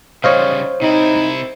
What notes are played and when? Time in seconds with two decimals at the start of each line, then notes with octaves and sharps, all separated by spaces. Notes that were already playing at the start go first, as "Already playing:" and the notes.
0.24 C#3 G3 C5 C#5 D#5 F5
0.82 C3 D#4 E4